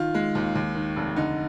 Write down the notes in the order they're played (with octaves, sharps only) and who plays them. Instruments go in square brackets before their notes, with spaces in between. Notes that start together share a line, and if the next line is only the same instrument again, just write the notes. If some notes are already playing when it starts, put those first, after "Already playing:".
Already playing: [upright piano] D#3 F4
G#3
D#2
D#2
D#3
F1
D3 D#4